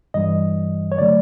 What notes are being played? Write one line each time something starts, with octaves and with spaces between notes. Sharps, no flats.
G2 E3 G3 D#5
C#5
D3 F#3 A3 D5